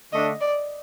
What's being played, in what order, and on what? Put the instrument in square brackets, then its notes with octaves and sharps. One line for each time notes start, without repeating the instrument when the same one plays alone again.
[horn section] D3 A3 D4 [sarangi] D#5
[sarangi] D5